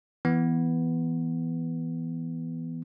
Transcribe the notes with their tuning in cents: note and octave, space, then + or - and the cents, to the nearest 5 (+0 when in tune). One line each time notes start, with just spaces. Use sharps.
E3 +0 B3 +0